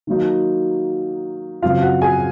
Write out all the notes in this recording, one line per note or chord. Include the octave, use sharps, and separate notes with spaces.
D#3 F#3 A#3 D#4
F#2 C#3 F#3 C4 F4 F5
F#4 F#5
G#4 G#5